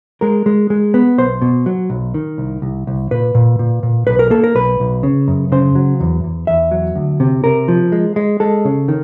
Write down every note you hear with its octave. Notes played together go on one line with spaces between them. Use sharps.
G#3 A#4
G#3
G#3
B3
B1 C5
B2
F#3
B1
D#3
C2
C2
C2
A#2 B4
A#2
A#2
A#2
B1 B4
A#4
A#3 A4
A#4
B1 B4
B1
C#3
F#2
C#3 C5
F#3
E2
E2
E2 E5
F#3
D2
C3
C3 A#4
F3
G#3
G#3
G#3 A4
C#3
D#3